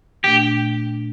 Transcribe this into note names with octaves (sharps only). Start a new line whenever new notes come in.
A#2 A3 D4 G4